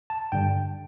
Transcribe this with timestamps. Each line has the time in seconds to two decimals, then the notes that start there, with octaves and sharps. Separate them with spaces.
0.10 A5
0.32 G2 D3 G3 G5